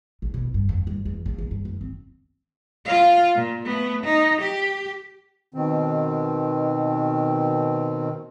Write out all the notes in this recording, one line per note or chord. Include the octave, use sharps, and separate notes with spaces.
A#1
B2
G2
F2
G2
E2
A#1
E2
G2
F#2
C4
F4 F5
A#2
A3 B3
D#4
G4
B2 D#3 C4